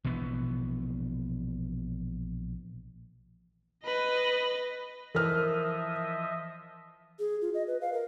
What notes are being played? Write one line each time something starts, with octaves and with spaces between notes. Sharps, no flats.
A#1 B2 E3 B3
B4 D#5
E3 F3 A#4 D#5 E5 F6
G#4
F4
D#5
B4
F5
A#4